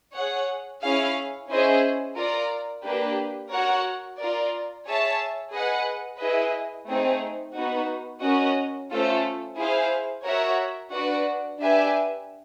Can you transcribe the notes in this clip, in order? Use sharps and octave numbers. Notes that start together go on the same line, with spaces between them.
G#4 C#5 F#5
C#4 E4 G#4 C#5 F5
C#4 E4 G#4 C5 D#5
F4 A#4 D5
A#3 D4 G4 B4
F#4 A#4 C#5 F#5
F4 A#4 D5
G#4 C#5 E5 A5
G#4 B4 D#5 F#5
E4 G#4 B4 D#5
A3 C4 D#4 G#4
B3 D#4 F#4
C#4 F#4 A#4 D#5
A3 C#4 F4 A4 C5
E4 G#4 C5 F5
F#4 A#4 C#5 E5
D4 F#4 B4 D5
D4 G4 B4 E5 G#5